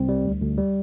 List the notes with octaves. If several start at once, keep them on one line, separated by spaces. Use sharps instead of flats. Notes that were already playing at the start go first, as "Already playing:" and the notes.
Already playing: C2 C4
G3
D2
D2
G3